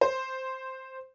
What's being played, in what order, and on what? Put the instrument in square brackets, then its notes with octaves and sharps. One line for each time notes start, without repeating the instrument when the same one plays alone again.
[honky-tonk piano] C5